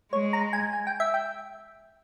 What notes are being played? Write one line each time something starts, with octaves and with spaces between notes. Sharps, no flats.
G#3 C#5
A#5
G#5
G#5
G5
E5
G5